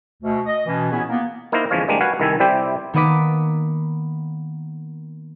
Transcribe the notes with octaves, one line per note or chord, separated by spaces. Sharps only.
D2 B2
D#5
B2 E3 C#4
A#2 B3 C#4 E4 G#4
A#3 B3
A#3 D#4 E4 C5 F5 A#5
E2 C#3 F3 G#3 C#5 F5
C3 G3 G#3 A#3 D4
F#4 B4 F5 F#5 G#5
C2 D#3 E4 A4 E5 G#5
C3 G3 E4 G4 C5 G5
D#3 A#3 B3 D#5 D6 B6